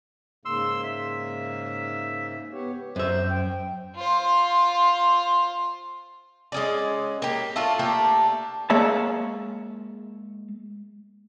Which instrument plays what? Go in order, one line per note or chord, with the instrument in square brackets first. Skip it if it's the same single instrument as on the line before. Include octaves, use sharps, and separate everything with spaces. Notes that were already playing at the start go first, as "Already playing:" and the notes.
[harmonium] G#2 C#3 A#3 [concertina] C6 E6
[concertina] E5
[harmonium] B3 G4 C#5
[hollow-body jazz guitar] F#2 E5 [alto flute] C5
[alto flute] G5
[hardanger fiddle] F4 C5
[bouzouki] G#3 C#4 D5
A#3 G4
A3 D4 F4
A3 A#3 D4 G4
[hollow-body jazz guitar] G#3 A#3 C#5 E5 A5